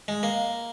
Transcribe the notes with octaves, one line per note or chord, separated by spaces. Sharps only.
G#3
A#3